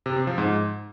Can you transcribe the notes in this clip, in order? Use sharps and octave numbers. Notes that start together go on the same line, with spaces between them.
C3
C4
F3
G#2